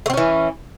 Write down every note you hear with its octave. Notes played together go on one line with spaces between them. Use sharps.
E3 A3 C4 C#4